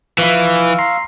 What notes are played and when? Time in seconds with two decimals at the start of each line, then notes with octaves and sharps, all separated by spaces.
0.19 E3 F3 E5 F5 C#6 E6
0.78 A#5 C6 C7